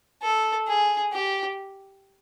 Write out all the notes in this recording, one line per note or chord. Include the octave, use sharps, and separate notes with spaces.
A4
G#4
G4